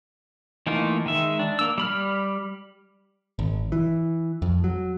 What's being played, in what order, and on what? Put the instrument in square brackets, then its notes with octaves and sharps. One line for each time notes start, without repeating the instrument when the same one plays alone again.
[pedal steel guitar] E3 A3 A#3 D#4 F4
D#3 G#3 E5
D4
A#3 E6
G3 B5 F6
[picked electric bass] G#1
E3
F2
F#3